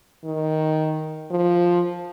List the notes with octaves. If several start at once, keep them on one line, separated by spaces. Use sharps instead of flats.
D#3
F3